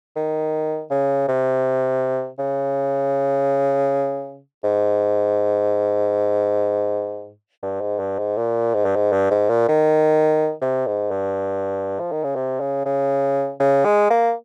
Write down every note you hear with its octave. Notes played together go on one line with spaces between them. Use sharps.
D#3
C#3
C3
C#3
G#2
G2
G#2
G2
G#2
A#2
G#2
G2
G#2
G2
G#2
A#2
D#3
C3
G#2
G2
F3
D#3
C#3
C3
C#3
C#3
C#3
G#3
A#3